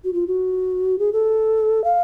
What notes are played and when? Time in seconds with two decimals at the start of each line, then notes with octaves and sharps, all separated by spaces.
0.04 F#4
0.13 F4
0.27 F#4
0.99 G#4
1.13 A4
1.84 F5